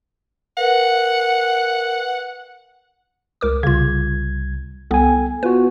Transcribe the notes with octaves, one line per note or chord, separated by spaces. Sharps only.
A#4 B4 F#5
C#2 A#4 D6
C2 C#3 F4 G#6
C2 B3 A4 G5 G#5
B3 F4 F#4 B4